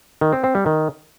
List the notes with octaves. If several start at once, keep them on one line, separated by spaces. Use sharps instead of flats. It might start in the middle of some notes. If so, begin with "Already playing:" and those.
D#3
C4
C4
G3
D#3